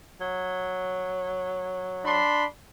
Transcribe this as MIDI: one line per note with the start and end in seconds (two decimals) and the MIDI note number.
0.21 2.19 54
2.05 2.45 62
2.05 2.45 83
2.05 2.45 84